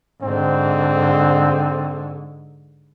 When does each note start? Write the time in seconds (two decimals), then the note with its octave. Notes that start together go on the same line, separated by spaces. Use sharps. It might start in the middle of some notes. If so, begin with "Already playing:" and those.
0.22 G#2 D3 C4